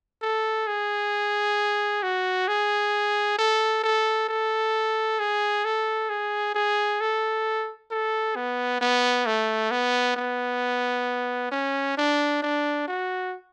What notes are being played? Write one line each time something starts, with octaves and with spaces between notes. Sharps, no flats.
A4
G#4
F#4
G#4
A4
A4
A4
G#4
A4
G#4
G#4
A4
A4
B3
B3
A3
B3
B3
C#4
D4
D4
F#4